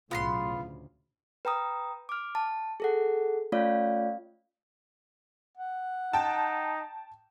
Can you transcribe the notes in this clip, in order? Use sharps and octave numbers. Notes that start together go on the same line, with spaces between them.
B1 A2 C#3 B3 F4 A#5 C6
D2
B4 G5 A#5 D#6
D6 F6
A5
G#4 A4 F#5
A3 C#4 F4 C#5 D5 F5
F#5
D#4 G5 A5